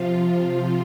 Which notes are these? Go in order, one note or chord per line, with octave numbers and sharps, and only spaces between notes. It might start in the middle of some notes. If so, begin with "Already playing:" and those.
Already playing: C3 F3 F4
F4